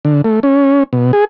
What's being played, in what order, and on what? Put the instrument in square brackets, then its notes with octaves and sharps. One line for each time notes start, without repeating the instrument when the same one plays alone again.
[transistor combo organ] D3
A3
C#4
B2
G#4